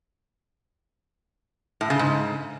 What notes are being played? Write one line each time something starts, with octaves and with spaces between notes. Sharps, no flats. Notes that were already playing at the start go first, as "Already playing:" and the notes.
A2
C#3
G#2